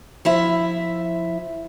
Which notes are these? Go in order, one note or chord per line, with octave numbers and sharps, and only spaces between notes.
F3 E4 E5